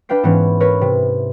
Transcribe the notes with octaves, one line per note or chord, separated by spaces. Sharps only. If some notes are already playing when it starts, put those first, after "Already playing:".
D4 B4 F5 G5 C7
G#2 E3 B3 C#4
A#4 B4 C#5
C3